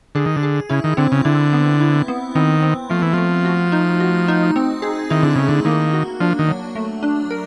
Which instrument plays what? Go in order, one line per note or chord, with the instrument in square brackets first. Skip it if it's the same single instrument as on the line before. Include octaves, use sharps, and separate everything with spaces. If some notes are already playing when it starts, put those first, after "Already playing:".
[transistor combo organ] D3 [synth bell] G#4
[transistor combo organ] D#3
D3
[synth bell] G#4
[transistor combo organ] C#3 [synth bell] E4
[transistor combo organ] D#3
[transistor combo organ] D3 [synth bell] C4
[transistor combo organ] C#3
[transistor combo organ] D3 [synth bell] E4
[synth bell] B3
E4
B3
[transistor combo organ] D#3 [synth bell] C4
[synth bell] C4
[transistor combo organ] F3 [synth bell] A3
[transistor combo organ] E3
[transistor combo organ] F3 [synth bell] A3
[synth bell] F#4
D#4
F#4
D#4
C4
G#4
[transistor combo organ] D#3 [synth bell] E4
[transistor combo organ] D3
[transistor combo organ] C#3 [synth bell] A3
[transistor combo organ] D3
[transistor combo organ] D#3 [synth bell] A#3
[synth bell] F#4
[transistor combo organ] F3 [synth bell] D4
[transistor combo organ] D#3
[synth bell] F#3
A3
D4
A#4